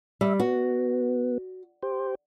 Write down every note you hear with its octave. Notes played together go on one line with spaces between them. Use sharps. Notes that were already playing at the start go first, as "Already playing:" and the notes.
G3 E5
B3 F#4
G4 C5